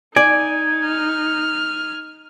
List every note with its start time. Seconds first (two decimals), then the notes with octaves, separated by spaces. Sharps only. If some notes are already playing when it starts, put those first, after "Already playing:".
0.16 D#4 D5 G#5
0.86 F6